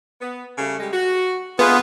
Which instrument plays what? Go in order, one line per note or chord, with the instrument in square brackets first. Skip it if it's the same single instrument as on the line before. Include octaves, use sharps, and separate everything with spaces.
[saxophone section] B3
C#3 G3 A3
G3 G#3
F#4
[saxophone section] D3 G#3 A3 [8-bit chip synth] B3 [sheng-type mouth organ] F4 G#4 B4